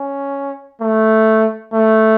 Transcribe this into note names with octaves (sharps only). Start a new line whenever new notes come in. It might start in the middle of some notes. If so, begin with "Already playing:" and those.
Already playing: C#4
A3
A3